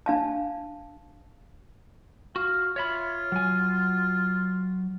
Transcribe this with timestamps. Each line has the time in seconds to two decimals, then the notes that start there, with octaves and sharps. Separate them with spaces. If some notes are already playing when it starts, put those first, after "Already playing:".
0.06 D4 F5 A5
2.36 F#4 F5
2.76 F4 C#5 E5 B5
3.32 F#3 G#5